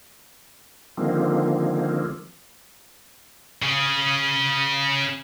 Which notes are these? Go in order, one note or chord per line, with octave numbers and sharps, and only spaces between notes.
D3 D#3 F3 G#3 A#3 C4
C#3 G#4